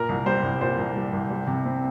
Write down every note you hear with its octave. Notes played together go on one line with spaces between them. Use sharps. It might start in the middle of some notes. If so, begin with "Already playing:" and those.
Already playing: A#2 A#4
C2
G3 C5
C2
A#2 C5
C2
G3
C2
G3
C3
C4